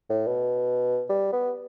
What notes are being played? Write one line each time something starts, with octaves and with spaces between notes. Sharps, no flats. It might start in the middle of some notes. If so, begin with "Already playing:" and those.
A2
B2
G3
B3